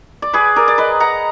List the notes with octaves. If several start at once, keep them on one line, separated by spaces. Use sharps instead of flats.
D5
G#4 B4
A#4 D5
D5
B4 D#5
F#5 A#5